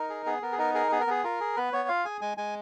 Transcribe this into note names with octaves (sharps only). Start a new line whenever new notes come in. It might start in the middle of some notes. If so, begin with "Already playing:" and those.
Already playing: D#4 A#4
G#4
B3 G#4
B3 A#4
G#4
D#4 A#4
G#4 A#4
B3 G#4
A#4
B3 G#4
F4 A#4
G#4
B3 B4
B3 C#5
F4 F5
G#4 G#5
G#3 G#5
G#3 G#5